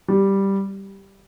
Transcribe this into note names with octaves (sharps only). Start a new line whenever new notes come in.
G3